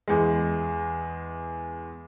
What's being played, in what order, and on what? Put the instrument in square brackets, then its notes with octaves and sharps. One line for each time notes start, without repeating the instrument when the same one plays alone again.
[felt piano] E2 G#3